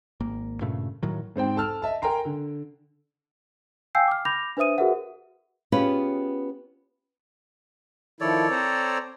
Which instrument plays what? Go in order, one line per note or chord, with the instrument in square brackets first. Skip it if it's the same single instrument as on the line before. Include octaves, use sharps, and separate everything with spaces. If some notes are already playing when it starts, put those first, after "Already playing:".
[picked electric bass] G#1 A#3
G2 A#2 C#3 A3
A2 D#3 F#3
[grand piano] G#2 C4 C5 G5
A4 A5 E6 F6
D#5 E5 A5
A#4 G5 G#5 A#5 C6
D3
[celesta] F5 G5 G#5 E6 G6 C7
D6 F6
B5 D6 G6 A#6 F7
D4 B4 C5 E5 D#6 D#7
F#4 G#4 A#4 B4 E5 F#5
[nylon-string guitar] B3 C#4 F4 G4 G#4 B4
[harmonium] D#3 F3 E4 [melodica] A4 C#5 D5
[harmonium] C4 C5 A#5